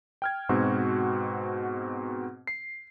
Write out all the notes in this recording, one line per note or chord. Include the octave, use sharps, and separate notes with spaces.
G5 F6 G#6
G#2 B2 C4 F#4
C7